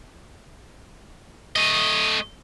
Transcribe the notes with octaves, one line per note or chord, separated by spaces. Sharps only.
A3 D#5